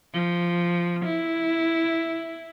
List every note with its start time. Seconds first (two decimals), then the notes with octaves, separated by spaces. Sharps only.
0.13 F3
1.05 E4